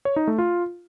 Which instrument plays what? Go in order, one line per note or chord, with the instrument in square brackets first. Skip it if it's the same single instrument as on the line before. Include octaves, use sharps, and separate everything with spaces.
[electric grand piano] C#5
D#4
A3
F4